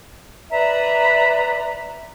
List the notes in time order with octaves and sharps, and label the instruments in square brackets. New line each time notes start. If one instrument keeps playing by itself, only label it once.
[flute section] B4 D5 E5 A#5